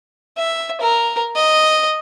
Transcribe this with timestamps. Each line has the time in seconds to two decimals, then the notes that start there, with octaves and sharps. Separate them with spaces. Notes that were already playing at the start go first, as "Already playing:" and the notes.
0.37 E5
0.81 A#4
1.36 D#5